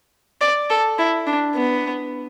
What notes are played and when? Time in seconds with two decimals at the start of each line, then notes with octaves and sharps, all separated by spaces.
0.41 D5
0.70 A4
0.99 E4
1.27 D4
1.56 B3